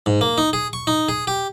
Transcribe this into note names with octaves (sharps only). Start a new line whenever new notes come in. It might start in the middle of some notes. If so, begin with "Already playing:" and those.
G#2
A#3
D#4
G#4
C#6
D#4
G#4
G4